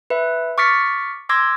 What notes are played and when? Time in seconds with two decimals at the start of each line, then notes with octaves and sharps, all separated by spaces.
0.10 B4 E5
0.58 C#6 D6 F6 A6 B6 C#7
1.29 C6 D6 E6 G#6 A#6